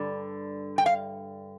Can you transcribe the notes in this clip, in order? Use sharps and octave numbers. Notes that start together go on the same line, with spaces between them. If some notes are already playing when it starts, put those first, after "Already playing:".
Already playing: G2 D3 G3
G5
F5